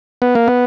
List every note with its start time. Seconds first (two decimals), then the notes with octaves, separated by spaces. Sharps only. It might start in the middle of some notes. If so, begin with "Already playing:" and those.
0.22 B3
0.35 A#3
0.48 B3